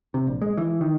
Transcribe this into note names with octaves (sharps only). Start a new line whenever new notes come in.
C3
A#1
G#3
E3
D#3